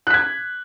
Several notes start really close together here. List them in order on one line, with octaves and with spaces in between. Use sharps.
F#6 B6 G#6